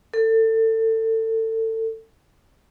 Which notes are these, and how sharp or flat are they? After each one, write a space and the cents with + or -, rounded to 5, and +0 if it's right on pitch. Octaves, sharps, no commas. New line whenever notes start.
A4 +25